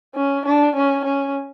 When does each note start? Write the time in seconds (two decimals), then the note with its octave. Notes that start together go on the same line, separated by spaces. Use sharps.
0.15 C#4
0.45 D4
0.75 C#4
1.05 C#4